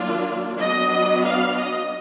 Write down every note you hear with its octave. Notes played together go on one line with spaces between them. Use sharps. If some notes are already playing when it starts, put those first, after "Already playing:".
Already playing: D#3 F#3 A#3 D4 F4
F#3 B3 D4 D#5
F5
D#5